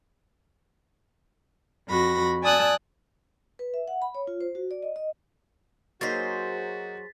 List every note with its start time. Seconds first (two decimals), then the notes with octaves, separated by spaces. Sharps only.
1.87 F2 F#4 B5 A#6
2.42 D5 G#5 A5 D#6 E6 F#6
3.59 B4
3.74 E5
3.88 F#5
4.02 B5
4.15 C#5
4.27 F4
4.41 C5
4.55 F#4
4.71 D5
4.83 D#5
4.96 D#5
6.01 F#3 A#3 D#4 F#4 G#4 C5 A6 B6